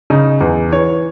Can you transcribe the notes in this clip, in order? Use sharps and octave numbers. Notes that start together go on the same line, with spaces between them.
C#3 D#4
E2
E3 C#5